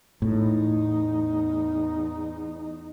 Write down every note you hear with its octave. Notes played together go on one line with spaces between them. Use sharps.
E2 A2 D#4